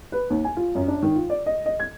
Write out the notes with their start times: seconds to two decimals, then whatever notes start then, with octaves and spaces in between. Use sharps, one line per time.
0.12 B4
0.30 D#2
0.44 G#5
0.57 F4
0.75 F#2
0.88 D4
1.03 D#3
1.15 F4
1.30 D5
1.46 D#5
1.66 D#5
1.80 G#6